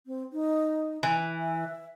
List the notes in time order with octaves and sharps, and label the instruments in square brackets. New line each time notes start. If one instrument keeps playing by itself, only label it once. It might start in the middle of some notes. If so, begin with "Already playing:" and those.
[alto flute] C4
D#4
[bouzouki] E3
[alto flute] E5